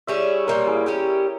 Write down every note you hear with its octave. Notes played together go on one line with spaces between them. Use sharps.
G3 C#4 E4 G#4 C#5 E5
A#2 G3 A#3 A#4 C#5
E4 G#4
E4
G3 C#4 G4